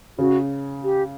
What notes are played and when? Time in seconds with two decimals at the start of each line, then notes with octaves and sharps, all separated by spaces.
0.18 C#3 F#4
0.84 G4